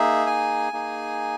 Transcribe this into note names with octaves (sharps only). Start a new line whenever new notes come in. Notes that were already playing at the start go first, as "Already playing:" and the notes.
Already playing: A#3 D#4 G#4 E5
G#5
A#3 D#4 G#4